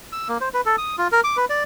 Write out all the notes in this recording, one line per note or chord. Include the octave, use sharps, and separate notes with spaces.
E6
A#3
C5
B4
A4
D#6
F4
A#4
D6
B4
D5